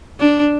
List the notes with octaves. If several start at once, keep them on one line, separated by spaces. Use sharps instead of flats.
D4